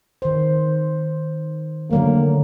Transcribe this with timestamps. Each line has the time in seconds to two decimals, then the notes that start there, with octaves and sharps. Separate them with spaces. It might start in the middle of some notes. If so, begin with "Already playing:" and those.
0.22 D#3 C5
1.91 D3 F#3 A3 A#3